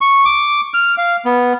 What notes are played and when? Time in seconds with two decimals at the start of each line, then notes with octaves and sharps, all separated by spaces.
0.01 C#6
0.25 D6
0.74 F6
0.98 F5
1.25 B3